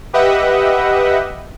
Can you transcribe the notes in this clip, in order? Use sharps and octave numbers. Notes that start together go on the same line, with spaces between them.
G4 B4 D#5 E5 F#5